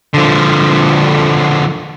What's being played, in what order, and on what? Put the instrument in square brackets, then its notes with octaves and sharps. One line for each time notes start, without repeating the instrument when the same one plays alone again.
[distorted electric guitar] D3 F3